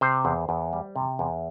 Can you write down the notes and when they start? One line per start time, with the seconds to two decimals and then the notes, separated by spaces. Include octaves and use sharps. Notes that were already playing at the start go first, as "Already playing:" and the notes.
0.01 C3 C5
0.25 E2
0.49 E2
0.73 G3
0.96 C3
1.19 E2